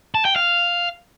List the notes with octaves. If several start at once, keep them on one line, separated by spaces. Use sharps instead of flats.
A5
G5
F5